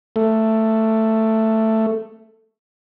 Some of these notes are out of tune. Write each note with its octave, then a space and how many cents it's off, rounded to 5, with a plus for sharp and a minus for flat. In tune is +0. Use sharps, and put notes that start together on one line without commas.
A3 +10